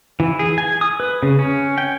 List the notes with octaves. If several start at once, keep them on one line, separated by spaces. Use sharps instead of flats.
E3
G#4
G#5
D#6
B4
C#3
C#4
G5